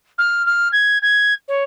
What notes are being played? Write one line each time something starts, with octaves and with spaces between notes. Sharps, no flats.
F6
F6
G#6
G#6
C#5